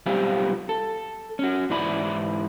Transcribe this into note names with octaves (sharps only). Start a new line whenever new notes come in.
B1 G3 C4 F4 G4 F5
A4
C#4 F#4
G#2 E3 E4 D5 B5